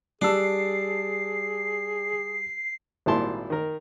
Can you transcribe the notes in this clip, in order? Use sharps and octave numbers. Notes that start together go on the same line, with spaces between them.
G3 D4 G#4 A5 E6 C7
G#1 A#2 G3 E4 A5 C6
D#3 A#4